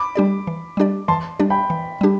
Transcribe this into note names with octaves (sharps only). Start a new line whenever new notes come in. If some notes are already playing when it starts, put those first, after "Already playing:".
Already playing: B5 D6
G3 D4 G4 D5
E3
G3 D4 G4 D5
E3 A5 C6
G3 D4 G4 D5
G5 B5
E3
G3 D4 G4